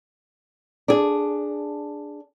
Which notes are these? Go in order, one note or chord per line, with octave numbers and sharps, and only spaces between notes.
D4 G#4